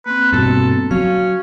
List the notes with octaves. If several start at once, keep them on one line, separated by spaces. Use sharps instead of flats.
A#3 C4 B4
G2 B2 A4
F#3 C#4 F5